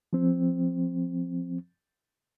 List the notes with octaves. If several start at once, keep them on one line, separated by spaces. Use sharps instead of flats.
F3 C4